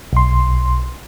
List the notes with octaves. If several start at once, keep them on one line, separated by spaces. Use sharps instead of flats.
B1 C6